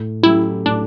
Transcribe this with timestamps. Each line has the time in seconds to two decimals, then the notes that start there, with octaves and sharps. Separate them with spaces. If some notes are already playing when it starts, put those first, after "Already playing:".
Already playing: A2
0.23 F#3 A3 C#4 E4 G4
0.65 A2 D4